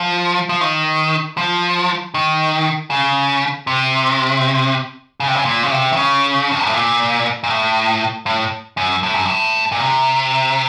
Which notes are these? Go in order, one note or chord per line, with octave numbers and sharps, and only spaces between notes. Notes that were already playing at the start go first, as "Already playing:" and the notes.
Already playing: F3
F3
D#3
F3
D#3
C#3
C3
C#3
C3
C#3
A#2
C#3
C3
D#3
C#3
F2
F#2
A2
A#2
A#2
A2
A2
F#2
A2
F#2
A2
A#2
C3